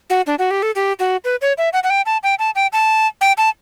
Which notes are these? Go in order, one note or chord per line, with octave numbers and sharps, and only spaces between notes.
F#4
D4
F#4
G4
A4
G4
F#4
B4
C#5
E5
F#5
F#5
G5
A5
G5
A5
G5
A5
G5
A5